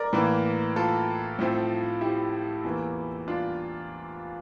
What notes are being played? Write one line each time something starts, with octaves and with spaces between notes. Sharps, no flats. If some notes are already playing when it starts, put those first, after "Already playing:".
Already playing: A#4 D5
A2 E3 A#3
F4 A4
A2 F3 A3 C4
E4 G4
E2 E3 A#3
D4 F4